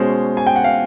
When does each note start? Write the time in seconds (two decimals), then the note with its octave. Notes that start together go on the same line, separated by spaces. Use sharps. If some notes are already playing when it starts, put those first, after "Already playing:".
Already playing: B2 G#3 C#4 C5
0.37 G#5
0.47 G5
0.56 F#5
0.64 F5